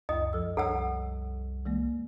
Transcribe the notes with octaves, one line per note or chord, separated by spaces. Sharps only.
C#2 F#2 D#5 D#6
F3 A4 E6
C2 A4 C#5 F#5 E6
E3 G#3 A#3